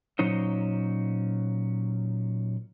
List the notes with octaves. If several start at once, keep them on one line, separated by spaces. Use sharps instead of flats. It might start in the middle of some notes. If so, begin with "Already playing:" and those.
A#2 F#3 C#4 D#4 C5